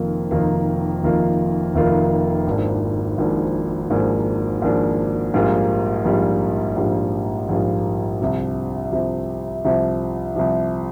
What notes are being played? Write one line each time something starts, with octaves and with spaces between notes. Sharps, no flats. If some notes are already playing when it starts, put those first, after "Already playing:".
Already playing: F1 F2 D#3 A#3 F4
F1 F2 D#3 A#3 F4
F1 F2 D#3 A#3 F4
F1 F2 D#3 A#3 F4
G#1 G#2 F3 A#3 D4
G#1 G#2 F3 A#3 D4
G#1 G#2 F3 A#3 D4
G#1 G#2 F3 A#3 D4
A#1 G#2 G3 A#3 F4
A#1 G#2 G3 A#3 F4
A#1 G#2 G3 A#3 F4
A#1 G#2 G3 A#3 F4
C2 C3 F3
C2 C3 F3
C2 C3 F3
C2 C3 F3